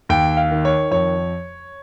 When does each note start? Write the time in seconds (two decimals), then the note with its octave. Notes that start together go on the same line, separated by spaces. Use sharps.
0.09 D#2 G5
0.37 F5
0.51 D#3
0.65 C#5
0.91 F2 C#5